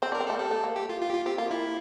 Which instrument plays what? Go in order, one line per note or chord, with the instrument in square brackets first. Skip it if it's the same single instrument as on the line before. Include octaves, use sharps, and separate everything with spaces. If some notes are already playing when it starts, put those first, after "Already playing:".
[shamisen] C4 [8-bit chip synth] C5
[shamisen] D4 [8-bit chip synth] A#4
[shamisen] C4
[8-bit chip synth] A4
[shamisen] A3
[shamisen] G3 [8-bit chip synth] A4
[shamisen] A3
A#3
[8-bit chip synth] G4
F4
F4
G4
F4
[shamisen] C4 [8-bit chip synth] G4
[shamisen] A#3 [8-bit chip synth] F4
[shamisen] A#3 [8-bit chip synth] E4